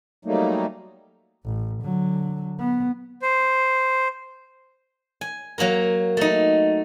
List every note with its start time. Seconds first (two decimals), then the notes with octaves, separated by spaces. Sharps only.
0.25 F#3 G3 A3 A#3 D#4
1.45 A1
1.82 D3 F#3
2.59 B3
3.22 C5
5.21 G#5
5.58 F#3 A#3 F#4 A#4
6.17 A3 D#4